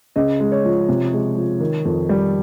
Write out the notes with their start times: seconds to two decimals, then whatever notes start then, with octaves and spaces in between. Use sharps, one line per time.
0.16 C#3 D#5
0.40 G#3
0.52 C#5
0.65 F3
0.89 C3
1.13 G#3
1.37 F3
1.60 D#3
1.85 F2
2.09 G3